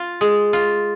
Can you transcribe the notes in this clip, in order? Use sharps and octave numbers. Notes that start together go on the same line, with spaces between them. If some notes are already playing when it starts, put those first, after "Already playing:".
Already playing: F4
G#3
F4